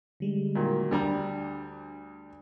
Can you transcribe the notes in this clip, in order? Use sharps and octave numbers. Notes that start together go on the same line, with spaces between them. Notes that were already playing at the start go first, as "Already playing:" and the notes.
D3 G3 G#3
A#2 D#3 F#3
D2 G3 D4 A#5